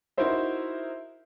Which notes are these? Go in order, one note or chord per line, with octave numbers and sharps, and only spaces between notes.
D#4 E4 F#4 A#4 C5 E5